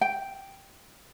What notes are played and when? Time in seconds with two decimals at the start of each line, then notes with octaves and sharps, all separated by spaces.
0.01 G5